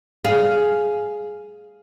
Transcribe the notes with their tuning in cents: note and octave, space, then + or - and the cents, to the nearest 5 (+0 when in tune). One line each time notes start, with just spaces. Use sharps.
G#4 +10 F5 +0